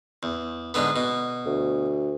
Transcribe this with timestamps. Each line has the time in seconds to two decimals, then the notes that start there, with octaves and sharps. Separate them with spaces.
0.23 E2
0.74 G#2 D3 B3
0.96 B2
1.46 D2